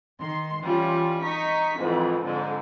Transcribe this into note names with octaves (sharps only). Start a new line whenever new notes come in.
D#3 C6
E3 G3 C#4 F4
D#4 C#6 B6
F2 G#2 E3
F2 G#2 D3